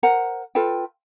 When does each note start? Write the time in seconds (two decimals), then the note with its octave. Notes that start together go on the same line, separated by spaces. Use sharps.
0.03 A#4 C5 F#5 A#5
0.55 F4 A4 B4 G5